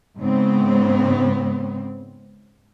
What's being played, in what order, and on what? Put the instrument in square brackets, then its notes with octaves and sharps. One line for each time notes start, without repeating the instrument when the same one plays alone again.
[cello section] G#2 C#3 B3 C4